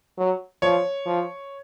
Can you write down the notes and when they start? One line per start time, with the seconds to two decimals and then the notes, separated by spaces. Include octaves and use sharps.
0.18 F#3
0.62 F3 C#5
1.06 F3